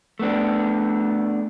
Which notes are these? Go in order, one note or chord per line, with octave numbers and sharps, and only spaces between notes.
A3 B3 D4